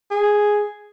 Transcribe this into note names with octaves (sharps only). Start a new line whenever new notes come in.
G#4